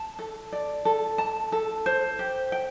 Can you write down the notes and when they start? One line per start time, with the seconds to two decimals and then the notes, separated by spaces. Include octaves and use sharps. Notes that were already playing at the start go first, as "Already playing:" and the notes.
Already playing: A5
0.19 A4
0.52 D5
0.85 A4
1.18 A5
1.52 A4
1.86 C5
2.19 G4
2.52 G5